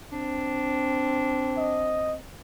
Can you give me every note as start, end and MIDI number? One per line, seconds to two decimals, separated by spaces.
0.12 2.22 60
0.12 1.96 62
1.58 2.15 75